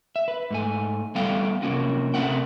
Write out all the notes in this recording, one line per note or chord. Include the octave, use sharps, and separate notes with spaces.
E5
B4
G#2 A3 G#5
G3 A3 B3 A4 F5 G5
C3 F#3 A#3 C#4 F4 F#4
C3 A3 C4 A#4 F#5 G5